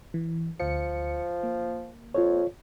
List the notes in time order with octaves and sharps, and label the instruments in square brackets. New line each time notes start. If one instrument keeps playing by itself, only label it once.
[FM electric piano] E3
[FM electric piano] D2 C#7 [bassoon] F3
[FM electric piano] A#3
[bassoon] F2 [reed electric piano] F4 C#5